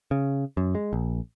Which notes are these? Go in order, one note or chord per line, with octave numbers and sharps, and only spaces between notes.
C#3
F#2
G#3
A#1